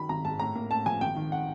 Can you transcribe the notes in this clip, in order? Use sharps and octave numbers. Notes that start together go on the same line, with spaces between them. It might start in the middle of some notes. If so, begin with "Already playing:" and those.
Already playing: D#3 F#3 B5
G#1 A#5
G#2 A5
A2 A#5
A#3
A2 A5
F3 G#5
G#1 G5
D#3
F#5